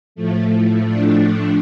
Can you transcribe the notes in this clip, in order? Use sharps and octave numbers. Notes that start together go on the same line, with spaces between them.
A2 F3 A3
D4